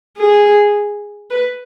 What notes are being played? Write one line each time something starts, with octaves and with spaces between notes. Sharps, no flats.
G#4
B4